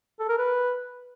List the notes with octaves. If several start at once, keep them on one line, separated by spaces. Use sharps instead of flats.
A4
A#4
B4